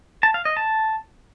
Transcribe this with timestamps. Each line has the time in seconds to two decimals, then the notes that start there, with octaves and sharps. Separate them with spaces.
0.23 A5
0.34 F5
0.45 D#5
0.57 A5